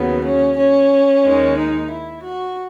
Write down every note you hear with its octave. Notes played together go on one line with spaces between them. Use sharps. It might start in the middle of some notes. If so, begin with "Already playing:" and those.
Already playing: D#2 C#3 F#3 B3
C#4
C#4
D#2 D#3 G#3
D#4
E4
F#4